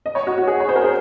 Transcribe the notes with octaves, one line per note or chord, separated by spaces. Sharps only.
D#5
C#5
F#4
F#4
G#4
C#5
C5
A#4
G#4